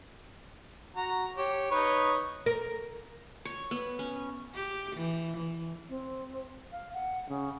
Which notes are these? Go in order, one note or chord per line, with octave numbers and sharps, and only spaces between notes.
F#4 A#5
G4 C#5
D#4 B4 C#5
A#4
C#5
B3
C#4
G4
E3
E3
C4
F5
F#5
C#3